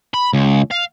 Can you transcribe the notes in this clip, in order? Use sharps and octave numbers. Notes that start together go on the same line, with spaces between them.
B5
C#2
F5